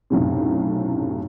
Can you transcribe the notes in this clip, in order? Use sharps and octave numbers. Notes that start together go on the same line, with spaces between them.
B1 F#2 A2 C3